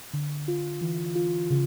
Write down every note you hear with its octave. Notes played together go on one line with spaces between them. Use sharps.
D3
F4
E3
F4
C#3